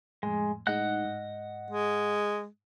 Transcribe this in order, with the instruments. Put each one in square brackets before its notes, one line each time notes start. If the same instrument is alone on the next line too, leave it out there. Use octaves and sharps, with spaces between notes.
[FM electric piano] F2 A2 [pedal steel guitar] G#3
[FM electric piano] A2 G#3 D#4 [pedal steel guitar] D#5 F#5 F#6
[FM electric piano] G#2
[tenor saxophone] G#3